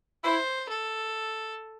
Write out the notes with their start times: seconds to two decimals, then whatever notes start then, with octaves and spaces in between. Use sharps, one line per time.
0.24 E4 C5
0.69 A4